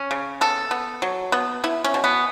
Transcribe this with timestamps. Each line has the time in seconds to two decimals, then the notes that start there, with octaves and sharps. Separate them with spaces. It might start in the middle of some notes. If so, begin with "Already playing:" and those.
Already playing: C#4
0.11 C#3
0.41 B3 A4
0.71 B3
1.02 F#3
1.32 B3
1.64 B3 E4
1.84 C#4
1.94 B2
2.04 B3